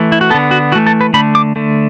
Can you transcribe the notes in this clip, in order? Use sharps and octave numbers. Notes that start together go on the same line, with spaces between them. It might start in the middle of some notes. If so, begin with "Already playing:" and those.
Already playing: E3 A3
E4
F#4
D3 B3 A4
F#4
E3 A3 F#4
A4
B4
D3 A3 B5
D6
D3 A3